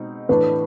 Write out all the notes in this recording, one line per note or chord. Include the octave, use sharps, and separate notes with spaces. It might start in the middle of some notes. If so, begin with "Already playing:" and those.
Already playing: B2 G#3 C4 D#4
A2 E3 A3 D4 B4